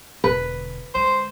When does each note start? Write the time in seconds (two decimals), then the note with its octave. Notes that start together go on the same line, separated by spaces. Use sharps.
0.24 E1 D3 B4
0.95 D3 G#3 C5